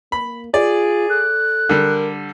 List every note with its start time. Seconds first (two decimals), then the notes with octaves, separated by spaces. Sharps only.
0.12 A#3 B5
0.54 F4 G#4 D5
1.10 A4 F#6
1.69 D3 G3 A#4